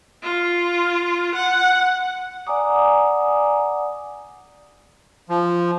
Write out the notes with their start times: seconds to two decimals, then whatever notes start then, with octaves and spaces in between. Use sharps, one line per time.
0.23 F4
1.35 F#5
2.47 D5 F#5 G#5 A#5 D6 D#6
5.29 F3